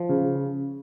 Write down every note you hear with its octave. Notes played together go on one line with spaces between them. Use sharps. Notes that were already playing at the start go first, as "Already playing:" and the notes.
Already playing: F3
C#3